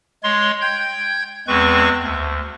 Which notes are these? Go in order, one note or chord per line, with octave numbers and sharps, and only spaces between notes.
G#3 C#5 C6
G5 G6 G#6
E2 G#3 C4 B4 C#6
D2